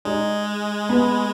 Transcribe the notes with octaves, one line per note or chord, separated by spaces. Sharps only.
G#3 D#4
B3